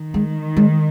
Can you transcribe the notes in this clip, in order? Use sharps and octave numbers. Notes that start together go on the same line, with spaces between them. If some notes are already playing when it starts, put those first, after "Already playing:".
Already playing: D#3
G#3
G#3